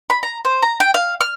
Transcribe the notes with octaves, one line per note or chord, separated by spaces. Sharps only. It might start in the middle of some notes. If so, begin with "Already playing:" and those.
B5
A#5
C5
A#5
G5
F5
F6